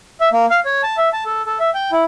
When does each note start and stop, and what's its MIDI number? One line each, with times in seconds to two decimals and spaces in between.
0.21 0.29 76
0.33 0.46 58
0.50 0.60 77
0.65 0.82 73
0.83 0.97 81
0.97 1.09 76
1.13 1.24 81
1.26 1.42 69
1.46 1.58 69
1.60 1.70 76
1.74 1.91 79
1.92 2.04 64